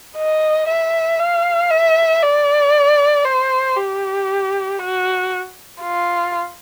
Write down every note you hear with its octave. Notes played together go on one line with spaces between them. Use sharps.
D#5
E5
F5
E5
D5
C5
G4
F#4
F4